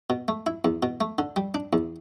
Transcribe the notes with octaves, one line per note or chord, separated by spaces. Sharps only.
B2
A3
E4
E2
B2
A3
D3
G3
D4
E2